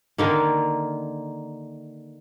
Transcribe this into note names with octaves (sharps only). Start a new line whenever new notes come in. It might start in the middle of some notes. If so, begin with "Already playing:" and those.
D3 D#3 A#3